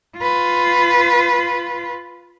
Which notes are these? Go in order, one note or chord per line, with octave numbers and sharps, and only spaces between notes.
F4 B4